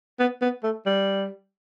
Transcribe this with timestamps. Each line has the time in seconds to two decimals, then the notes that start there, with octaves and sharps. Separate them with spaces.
0.19 B3
0.41 B3
0.63 A3
0.86 G3